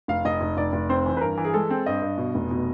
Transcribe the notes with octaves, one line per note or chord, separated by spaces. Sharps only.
F1 F5
F1 D#5
F1
F1 D5
F1
C4 C5
E3
B4
G2 A#4
E3
G#4
G#3 A4
C4
G2 D#5
G2
B2
F1
B2